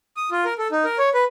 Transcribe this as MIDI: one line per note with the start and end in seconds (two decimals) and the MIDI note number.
0.17 0.30 87
0.31 0.44 65
0.45 0.54 70
0.58 0.67 69
0.72 0.84 63
0.84 0.98 70
0.99 1.09 73
1.14 1.24 71